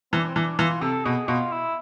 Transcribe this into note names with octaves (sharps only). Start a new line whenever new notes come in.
E3 C4
D4
C4
E3 D4
E3 F4
C3 A4
B2 G#4
B2 F4
E4